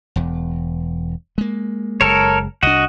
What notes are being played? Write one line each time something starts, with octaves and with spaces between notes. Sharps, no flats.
E1 E2
G#3 A#3
F#1 G#3 A4 A#4 C#5
C2 D4 F#4 D#5